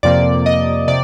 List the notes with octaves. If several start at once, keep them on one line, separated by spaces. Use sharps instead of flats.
F2 C3 F3 A#3 D5
D#5
C3 D5